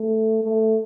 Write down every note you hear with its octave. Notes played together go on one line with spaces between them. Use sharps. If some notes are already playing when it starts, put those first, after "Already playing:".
Already playing: A3
A3